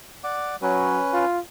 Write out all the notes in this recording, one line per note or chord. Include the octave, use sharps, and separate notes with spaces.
D5 F#5 D6
F#3 C#4 B4
F4